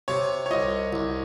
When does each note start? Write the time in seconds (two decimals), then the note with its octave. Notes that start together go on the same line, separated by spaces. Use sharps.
0.08 C3 C#5
0.46 C#5
0.51 C2 D#5
0.93 C2